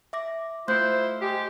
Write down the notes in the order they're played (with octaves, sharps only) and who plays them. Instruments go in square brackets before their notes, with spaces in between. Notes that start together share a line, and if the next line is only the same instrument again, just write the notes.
[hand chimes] E5 D6 A#6
[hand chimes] A3 F#6 G6 [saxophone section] E4 F4 C5
[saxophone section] G#3 G4